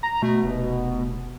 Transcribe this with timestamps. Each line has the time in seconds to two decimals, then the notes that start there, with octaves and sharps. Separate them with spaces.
0.03 A#5
0.22 B2 A3
0.44 F1